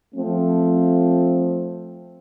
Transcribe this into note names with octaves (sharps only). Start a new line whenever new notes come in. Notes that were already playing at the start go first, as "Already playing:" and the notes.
F3 A3 C4